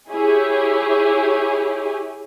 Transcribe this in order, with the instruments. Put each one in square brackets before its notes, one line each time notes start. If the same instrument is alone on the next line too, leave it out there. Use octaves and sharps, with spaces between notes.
[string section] E4 G4 G#4 C#5